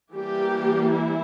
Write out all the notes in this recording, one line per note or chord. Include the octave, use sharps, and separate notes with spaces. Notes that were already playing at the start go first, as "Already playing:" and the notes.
E3 G3 A#3 G4
E4